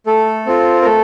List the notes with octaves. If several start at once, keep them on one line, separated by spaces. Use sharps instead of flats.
A3 A4
C4 F4
A#4
A3 A4